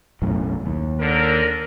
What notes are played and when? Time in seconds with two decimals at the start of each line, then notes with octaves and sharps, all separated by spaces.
0.22 B1 F#2 A2
0.66 D#2
1.00 D3 A#4